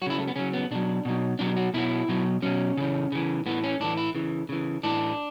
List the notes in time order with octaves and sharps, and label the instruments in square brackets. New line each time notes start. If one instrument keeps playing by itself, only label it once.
[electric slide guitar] F#3 F#4
C#3 E4
A3
B3
C#3 F#3 C#4
B3
B2 F#3 D4
B2 F#3
B2 F#3 D4
F#4
B2 F#3 E4
B2 F#3
B2 F#3 C#4
C#3 E3
C#3 E3
A2 E3 B3
C#4
A2 E3 D4
E4
C#3 E3
C#3 E3
A2 E3 D4